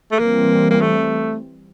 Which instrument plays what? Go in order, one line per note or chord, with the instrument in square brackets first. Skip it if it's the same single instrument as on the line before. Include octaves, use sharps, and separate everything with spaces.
[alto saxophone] A3
[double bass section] E3 G3 C4 [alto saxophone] A#3
[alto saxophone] A#3
A3